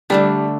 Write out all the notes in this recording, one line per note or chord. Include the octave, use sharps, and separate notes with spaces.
D3 G3 A3 D4